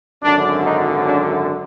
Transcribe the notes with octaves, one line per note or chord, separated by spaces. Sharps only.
G#1 F#2 D3 F#3 D4
D#4
D4